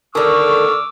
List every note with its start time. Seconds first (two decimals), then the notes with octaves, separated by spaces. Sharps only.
0.15 D3 D#3 C#6 D6 E6 F6